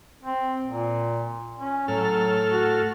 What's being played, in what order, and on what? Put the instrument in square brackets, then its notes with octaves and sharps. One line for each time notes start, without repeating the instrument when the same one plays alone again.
[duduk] C4
A#2
C#4
[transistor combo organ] A2 A4 F6 [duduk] F#3
[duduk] F#4